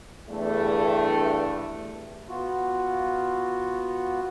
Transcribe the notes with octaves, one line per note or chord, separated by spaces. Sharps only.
E2 G2 A3
B3 F4 F#4